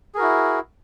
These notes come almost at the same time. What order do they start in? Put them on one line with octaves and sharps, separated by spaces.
G#4 A#4 F#4 E4